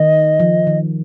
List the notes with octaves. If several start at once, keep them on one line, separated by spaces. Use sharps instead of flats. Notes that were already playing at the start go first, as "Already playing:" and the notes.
Already playing: D#3 D#5
F3
D#3